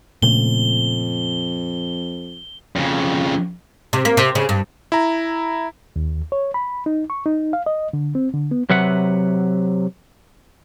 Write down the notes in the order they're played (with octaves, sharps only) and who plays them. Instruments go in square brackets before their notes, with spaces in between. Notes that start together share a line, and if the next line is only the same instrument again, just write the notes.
[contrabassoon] F2 [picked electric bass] A#2 C#3 A3 [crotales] G7
[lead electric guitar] F2 C#3
[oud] C3
A#3
C3
C#3
G2
[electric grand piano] E4 A#5
[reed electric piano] D#2
C#5
B5
D#4
C#6
D#4
F5
D#5
D3
C4
D3
B3
[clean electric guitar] C3 F#3 B4 E5 F#5